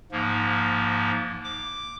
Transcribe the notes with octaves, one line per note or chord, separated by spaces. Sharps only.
G#2 F3 A#3
D6